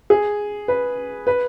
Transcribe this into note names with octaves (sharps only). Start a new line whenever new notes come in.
G#4
B4
B4